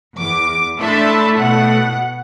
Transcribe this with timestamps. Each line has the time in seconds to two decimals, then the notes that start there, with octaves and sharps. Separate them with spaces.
0.17 E2 D6
0.79 A2 A3 D4 E5 A5 B5 C6
1.38 B2 F#5